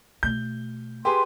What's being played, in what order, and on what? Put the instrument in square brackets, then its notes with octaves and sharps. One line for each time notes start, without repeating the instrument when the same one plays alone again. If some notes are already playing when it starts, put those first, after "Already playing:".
[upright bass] B2 A3 [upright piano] G6
[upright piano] G4 G#4 B4 [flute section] C6